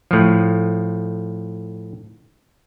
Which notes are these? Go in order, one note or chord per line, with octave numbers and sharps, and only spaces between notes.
A2 F3